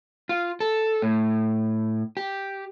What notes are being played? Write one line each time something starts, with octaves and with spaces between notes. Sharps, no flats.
F4
A4
A2
G4